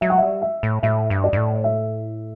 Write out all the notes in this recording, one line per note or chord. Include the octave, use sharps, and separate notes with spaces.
F#3 E5
F#5
G3 E5
E5
A2
A2 E5
G2
D5
G2
A2
E5